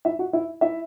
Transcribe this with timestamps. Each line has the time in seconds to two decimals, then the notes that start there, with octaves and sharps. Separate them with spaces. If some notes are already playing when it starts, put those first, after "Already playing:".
0.05 E4 E5
0.19 F#4 F#5
0.33 E4 E5
0.61 E4 E5